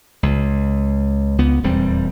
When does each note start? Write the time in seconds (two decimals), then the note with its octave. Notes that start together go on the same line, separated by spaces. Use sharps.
0.23 C#2
1.38 C#2 B3
1.63 D#1 E2 G3 C4